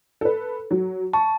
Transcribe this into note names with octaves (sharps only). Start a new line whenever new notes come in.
A4 B4
F#3
A5 C#6